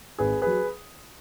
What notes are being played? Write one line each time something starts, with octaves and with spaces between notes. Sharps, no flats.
G#1 G#4 B4
F#3 G#4 B4